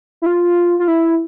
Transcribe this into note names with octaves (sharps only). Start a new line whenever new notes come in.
E4
F4
F4
E4